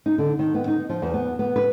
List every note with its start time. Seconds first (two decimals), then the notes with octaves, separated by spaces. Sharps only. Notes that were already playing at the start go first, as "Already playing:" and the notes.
0.06 D#4
0.18 D3
0.39 D#3
0.54 B3
0.67 D#4
0.89 F3
1.02 E2
1.14 B3
1.39 B3
1.56 B4